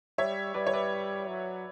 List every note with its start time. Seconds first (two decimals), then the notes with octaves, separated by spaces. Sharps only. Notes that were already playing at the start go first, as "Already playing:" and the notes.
0.18 G3 C#5 E5
0.54 G3 B4 D5
0.67 C#5
0.73 B4 D5
1.28 F#3